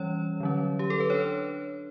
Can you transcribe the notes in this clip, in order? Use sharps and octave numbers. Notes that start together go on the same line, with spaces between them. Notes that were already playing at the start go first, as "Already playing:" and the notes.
Already playing: E3 G3 C#4 C#5
D3 F#3 C#4
G4
A4
B4
D4 C#5